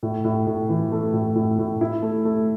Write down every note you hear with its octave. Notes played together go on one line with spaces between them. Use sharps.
A2
A2
A2
E3
A3
A2
A2
A2
E4
A3
A3